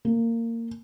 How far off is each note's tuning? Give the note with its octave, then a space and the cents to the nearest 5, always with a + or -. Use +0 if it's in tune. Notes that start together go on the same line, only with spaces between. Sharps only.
A#3 -20